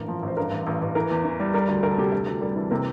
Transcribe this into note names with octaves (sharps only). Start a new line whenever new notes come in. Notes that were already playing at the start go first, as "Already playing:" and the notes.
Already playing: A1 G2 A#4
F3
A1 C5
G2 A#4
A1
A1
A1
E3 A#4
E2
E3
G3
G3 A#4
D2
D2 A#4
A4
C3 G4
D2 A4
D2
G3 A#4
E3
C3 A#4